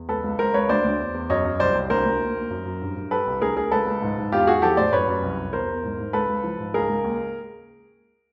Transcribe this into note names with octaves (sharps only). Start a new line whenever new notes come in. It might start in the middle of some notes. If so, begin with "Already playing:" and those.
Already playing: E2
C#2 A4 B4
C#2
C#2 A#4 C5
C#2 B4 C#5
D2 C5 D5
D2
E2
E2
F#2 C#5 D#5
F#2
C2 C5 D5
C2
D2 A#4 C5
D2
D#2
D#2
F#2
F#2
G2
G2
G3 A4 B4
C2
D2 G#4 A#4
D2 G#4 A#4
C#2 A4 B4
C#2
G#2
G#2
E2 F4 G4
E2 F#4 G#4
F3 G4 A4
A2 C5 D5
F#2 B4 C#5
F#2
C2
C2
E2 A#4 C5
E2
G#2
G#2
C#2 A4 B4
C#2
F3
G#2
C#2 G#4 A#4
C#2
D#2